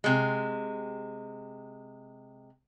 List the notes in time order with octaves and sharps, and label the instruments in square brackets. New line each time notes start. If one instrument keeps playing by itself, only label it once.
[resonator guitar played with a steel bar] C3 G#3